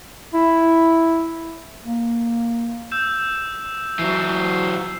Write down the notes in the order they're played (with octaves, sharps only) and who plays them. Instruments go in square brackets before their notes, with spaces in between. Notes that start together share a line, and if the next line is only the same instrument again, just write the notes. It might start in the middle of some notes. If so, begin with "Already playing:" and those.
[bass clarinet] E4
A#3
[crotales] E6 G6 E7
[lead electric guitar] E3 F#3 [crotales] C7